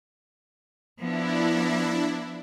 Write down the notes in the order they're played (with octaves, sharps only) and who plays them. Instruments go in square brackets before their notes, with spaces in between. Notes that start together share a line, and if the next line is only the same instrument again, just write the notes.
[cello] F3 B3 [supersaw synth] D4 E4